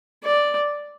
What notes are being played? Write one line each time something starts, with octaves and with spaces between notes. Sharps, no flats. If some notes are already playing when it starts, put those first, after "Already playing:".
D5